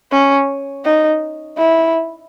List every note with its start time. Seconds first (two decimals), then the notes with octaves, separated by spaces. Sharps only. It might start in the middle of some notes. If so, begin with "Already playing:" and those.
0.12 C#4
0.85 D#4
1.58 E4